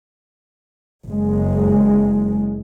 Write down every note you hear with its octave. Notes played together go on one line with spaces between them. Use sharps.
F#1 G#3